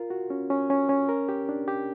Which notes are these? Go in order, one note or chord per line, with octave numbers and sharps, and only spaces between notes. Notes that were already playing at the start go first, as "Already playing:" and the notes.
Already playing: F4 A#4
F#4
C#4
C#4
C#4
C#4
A#4
G4
D4
G4